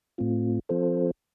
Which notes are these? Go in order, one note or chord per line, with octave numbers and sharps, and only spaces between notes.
A2 A3 C4 F4
F3 C4 F4 A4 C5